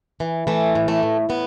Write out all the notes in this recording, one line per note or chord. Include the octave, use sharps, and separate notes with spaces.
E3
E3 A3
A2
A3
A2
A2 B3